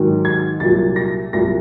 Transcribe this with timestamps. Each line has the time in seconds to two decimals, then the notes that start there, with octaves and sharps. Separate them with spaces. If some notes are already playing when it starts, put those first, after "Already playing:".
Already playing: G#2 D#3 F#3
0.25 G#6
0.60 C2 A#2 F#3 A6
0.96 A#6
1.33 C2 A#2 F#3 A#6